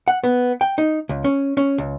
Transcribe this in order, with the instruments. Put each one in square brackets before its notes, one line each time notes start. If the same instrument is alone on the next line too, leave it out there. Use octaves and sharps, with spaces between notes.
[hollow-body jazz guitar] F#5
B3
G5
D#4
C#2
C#4
C#4
C#2